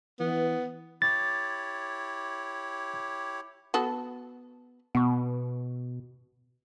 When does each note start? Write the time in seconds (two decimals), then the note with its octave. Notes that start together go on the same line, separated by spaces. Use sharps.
0.20 E3 B3
1.02 E4 G4 C#5 A6
3.74 B3 F#4 A4
4.95 B2 B3 C#6